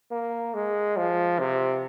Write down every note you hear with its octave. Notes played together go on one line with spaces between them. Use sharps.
A#3
G#3
F3
C3